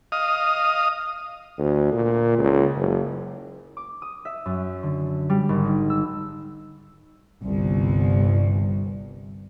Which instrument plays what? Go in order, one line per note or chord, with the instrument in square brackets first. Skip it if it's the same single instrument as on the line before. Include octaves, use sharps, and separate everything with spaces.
[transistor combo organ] D#5 F5 D#6
[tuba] D2
A#2
C#2
F#1
[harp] D6
D#6
E5
F#2
D3
G3
G#1
G#3
E6
[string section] G1 C2